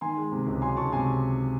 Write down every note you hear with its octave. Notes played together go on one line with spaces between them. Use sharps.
D#3 G#5 C6
G#3
C3
C#2
F#3 G#5 C6
C#2 A5 C#6
C3 G#5 C6